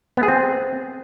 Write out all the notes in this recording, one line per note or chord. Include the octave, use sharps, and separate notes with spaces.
B3
G#4
C4